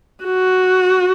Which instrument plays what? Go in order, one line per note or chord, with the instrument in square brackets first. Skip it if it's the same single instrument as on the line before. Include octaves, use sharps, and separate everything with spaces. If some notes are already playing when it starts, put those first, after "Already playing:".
[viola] F#4